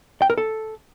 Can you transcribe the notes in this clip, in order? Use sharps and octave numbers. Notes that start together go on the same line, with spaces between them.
G5
A#4
A4